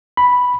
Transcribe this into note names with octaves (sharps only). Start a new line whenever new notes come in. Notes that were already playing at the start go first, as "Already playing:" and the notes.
B5